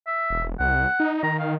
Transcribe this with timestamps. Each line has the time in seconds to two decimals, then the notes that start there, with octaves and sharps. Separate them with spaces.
0.07 E5
0.30 E1
0.60 C2 F#5
1.00 D#4
1.23 D#3 A#5
1.39 F5